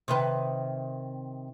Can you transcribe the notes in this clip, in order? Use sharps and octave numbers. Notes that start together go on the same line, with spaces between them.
C3 D#3 B4